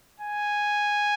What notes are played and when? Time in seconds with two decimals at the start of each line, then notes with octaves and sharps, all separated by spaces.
0.20 G#5